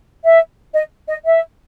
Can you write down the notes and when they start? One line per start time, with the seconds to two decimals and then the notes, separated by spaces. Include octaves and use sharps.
0.23 E5
0.74 D#5
1.08 D#5
1.25 E5